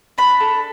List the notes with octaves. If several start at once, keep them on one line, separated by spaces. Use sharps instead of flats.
D4 B5
A4